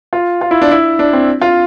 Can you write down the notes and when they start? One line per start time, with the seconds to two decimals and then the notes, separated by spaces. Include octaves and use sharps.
0.13 F4
0.41 F4
0.51 E4
0.62 D4
0.72 E4
0.99 D4
1.13 C4
1.42 F4